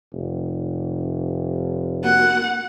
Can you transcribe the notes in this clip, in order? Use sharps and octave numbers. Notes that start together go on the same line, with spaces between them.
F1
A#3 F#4 F#5